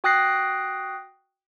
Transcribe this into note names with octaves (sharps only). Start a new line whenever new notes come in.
F#4 G5 D#6 F#6 A#6 C7